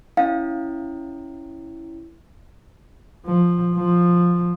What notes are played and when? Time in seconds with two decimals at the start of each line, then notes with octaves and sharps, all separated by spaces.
0.17 C#4 E4 F5
3.26 F3
3.76 F3